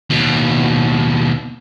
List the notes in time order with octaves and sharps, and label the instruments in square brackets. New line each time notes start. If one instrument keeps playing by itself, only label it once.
[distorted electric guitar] D#2 B2